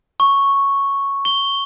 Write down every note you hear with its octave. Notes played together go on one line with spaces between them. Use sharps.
C#6
G7